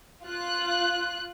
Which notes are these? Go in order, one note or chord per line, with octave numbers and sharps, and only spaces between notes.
F4 F#6